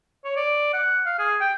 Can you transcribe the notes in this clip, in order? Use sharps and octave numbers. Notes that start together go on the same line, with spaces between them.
C#5
D5
F#5
F5
G#4
G5